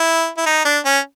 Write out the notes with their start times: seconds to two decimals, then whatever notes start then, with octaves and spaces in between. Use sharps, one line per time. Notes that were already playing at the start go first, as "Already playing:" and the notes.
Already playing: E4
0.38 E4
0.46 D#4
0.65 D4
0.85 C#4